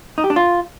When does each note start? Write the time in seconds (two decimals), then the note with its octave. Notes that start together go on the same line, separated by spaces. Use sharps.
0.18 D#4
0.24 G4
0.30 D4
0.36 F4